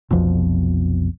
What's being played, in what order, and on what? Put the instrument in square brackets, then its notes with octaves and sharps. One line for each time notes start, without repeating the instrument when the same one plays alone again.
[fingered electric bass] F1 B1 F2 B2